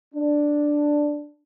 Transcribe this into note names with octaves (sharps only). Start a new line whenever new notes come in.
D4